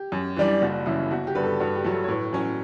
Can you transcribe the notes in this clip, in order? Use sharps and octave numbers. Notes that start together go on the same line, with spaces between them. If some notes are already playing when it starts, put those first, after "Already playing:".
Already playing: G4
F#2
E3 G3 D4
F#1 F#4
F#2 C#3 E3 E4
G1 F#4
G4
G2 D3 B4
A4
G2 F#4
G4
F#3 A3
A4
C#5
A2 B4
F#3 C#4 C#5